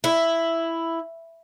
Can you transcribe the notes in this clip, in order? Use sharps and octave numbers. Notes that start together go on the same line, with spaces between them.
E4